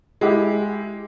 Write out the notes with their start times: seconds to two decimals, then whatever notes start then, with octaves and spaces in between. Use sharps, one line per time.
0.21 G#3 E4 G4